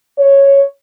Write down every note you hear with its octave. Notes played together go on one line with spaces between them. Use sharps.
C#5